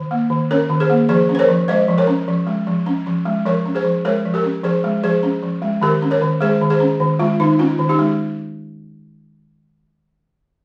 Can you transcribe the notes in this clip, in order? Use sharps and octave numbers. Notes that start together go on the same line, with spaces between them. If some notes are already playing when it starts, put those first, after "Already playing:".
Already playing: D#3
A#3
D#3
C#4 A#4 C#5
D#3
G#4 C5
A#3
F3 G#4 C5
C#4
C5
A#4 C#5
F3
G#3 C5 D#5
F3
A#4 C#5
C#4
F3
G#3
F3
C#4
F3
G#3
F3 A#4 C#5
C#4
G#4 C5
F3
G#3 A#4 C#5
F3
G4 A#4
C#4
F3 G#4 C5
G#3
F3 G#4 C5
C#4
F3
G#3
D#3 G4 A#4
C#4
A#4 C#5
D#3
G#3 G#4 C5
D#3
G#4 C5
C#4
D#3
G#3 F4
D#3 D#4
C#4 F4
D#3
D#4 G4
G#3